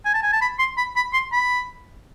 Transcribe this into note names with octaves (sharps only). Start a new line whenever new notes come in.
G#5
A5
G#5
A5
B5
C6
B5
B5
C6
B5